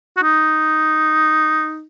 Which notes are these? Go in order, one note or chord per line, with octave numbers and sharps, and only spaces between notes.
F#4
D#4